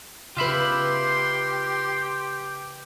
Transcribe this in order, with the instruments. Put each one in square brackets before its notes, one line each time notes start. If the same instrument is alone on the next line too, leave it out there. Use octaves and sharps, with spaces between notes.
[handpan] C#3 B4 [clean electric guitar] F4 E5 B5 [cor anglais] G4 [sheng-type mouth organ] C6